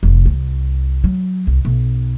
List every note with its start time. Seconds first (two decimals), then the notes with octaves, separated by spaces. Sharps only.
0.03 F1 C3
0.26 C2
1.04 F#3
1.47 C2
1.65 B1